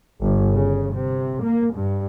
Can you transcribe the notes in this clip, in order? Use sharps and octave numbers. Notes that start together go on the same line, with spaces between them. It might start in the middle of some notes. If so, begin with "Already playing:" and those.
G1
C#3
C3
A#3
G2